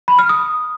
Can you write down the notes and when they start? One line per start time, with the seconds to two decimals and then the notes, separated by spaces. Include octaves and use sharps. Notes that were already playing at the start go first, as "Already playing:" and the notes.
0.08 B5
0.19 F6
0.29 D#6